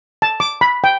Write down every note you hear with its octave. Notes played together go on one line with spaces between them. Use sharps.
A5
D6
B5
G5